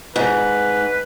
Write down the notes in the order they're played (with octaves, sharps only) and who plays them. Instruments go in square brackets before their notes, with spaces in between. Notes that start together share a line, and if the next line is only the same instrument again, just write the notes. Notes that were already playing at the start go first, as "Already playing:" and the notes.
[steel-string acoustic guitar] G#2 [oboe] B4